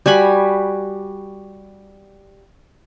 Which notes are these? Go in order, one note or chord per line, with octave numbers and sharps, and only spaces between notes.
G3 F#4 G#5 B5